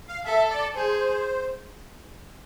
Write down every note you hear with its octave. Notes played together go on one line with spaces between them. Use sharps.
F5
A4 E5
D5
G#4 C5